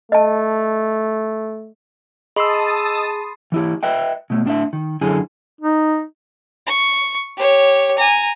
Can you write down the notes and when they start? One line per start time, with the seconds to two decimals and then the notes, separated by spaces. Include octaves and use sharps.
0.12 A3 D#5 A5
2.36 G#4 D#5 A5 B5 C6 D#6 E6 C7
3.52 E3 E4 G4
3.83 B4 D#5 E5 G5
4.30 B2 A3
4.46 A2 D4 D5 E5
4.73 D#3
5.01 F#2 D3 E4 G#4 G#5
5.61 D#4
6.67 C#6
7.37 G4 C#5
7.98 G#5 A#5